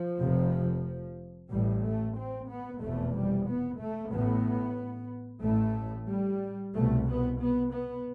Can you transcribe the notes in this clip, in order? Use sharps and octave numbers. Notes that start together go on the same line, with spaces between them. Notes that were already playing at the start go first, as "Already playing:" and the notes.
Already playing: F3
F1 F2 C3
A1 A2 G3
A3
C4
B3
F1 E2 B2 A3
G3
B3
A3
A1 A2 B3
A1 A2 A3
G3
C2 B2 A3
B3
B3
B3